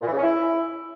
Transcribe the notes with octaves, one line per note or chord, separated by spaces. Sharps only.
A#2
E3
C#3
C#4
E4